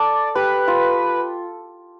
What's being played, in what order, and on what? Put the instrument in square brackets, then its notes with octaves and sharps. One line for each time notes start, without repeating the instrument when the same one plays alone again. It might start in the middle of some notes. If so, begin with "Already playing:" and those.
Already playing: [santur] A4 [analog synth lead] D5
[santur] G4 [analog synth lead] B4
[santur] F4